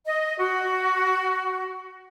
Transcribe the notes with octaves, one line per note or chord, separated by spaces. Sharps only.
D#5
F#4